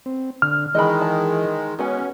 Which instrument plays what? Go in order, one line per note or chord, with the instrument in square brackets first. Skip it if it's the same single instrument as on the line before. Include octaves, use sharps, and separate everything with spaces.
[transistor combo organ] C4
[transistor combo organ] D3 [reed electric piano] F6
[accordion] D#3 G#3 [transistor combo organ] E3 [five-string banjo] D#5 G5 B5
[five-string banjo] A5
[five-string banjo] G#3 B3 G#5 [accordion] C#4 [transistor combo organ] F#4 C#5